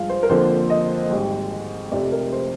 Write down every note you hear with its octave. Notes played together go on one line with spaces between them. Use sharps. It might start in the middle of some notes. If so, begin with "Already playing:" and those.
Already playing: G2 F3 G#3 F5
C5
A#4
F2 D3 F3 A#3 C5
D#5
G#1 G#2 G3
F1 F2 C3 D5
A#4
C5